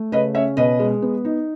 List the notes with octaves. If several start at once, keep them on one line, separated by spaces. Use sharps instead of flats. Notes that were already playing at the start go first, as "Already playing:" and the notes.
Already playing: A3
C#3 B4 D#5
C#4 C#5 E5
B2 B4 D#5
G#3
B3
D#4